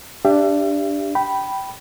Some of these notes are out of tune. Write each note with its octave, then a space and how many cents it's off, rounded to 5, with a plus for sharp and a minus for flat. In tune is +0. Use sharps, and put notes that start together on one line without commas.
D4 +0 G4 +10 E5 +40
G5 -15 B5 +0